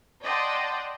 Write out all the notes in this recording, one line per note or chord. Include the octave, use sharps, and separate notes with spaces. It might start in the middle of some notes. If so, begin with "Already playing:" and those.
D5 D#5 F#5 G5 A5 C6